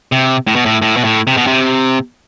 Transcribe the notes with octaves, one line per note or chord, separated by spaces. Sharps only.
C3
A2
B2
A2
A2
B2
A2
C3
B2
C3